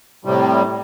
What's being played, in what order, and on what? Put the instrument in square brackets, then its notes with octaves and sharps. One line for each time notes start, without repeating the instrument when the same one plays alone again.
[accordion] A2 C3 G3